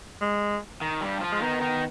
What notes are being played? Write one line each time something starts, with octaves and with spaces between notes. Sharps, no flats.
G#3
D#3
G2 G3
F3 F4
G#3
D#3 B3 D#4
D#3 D#4